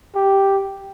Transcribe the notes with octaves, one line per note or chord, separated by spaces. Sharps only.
G4